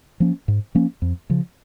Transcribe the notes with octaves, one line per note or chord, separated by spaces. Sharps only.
F3 A#3 C#4
G#2
F3 A#3 C#4
F2
C#3 F3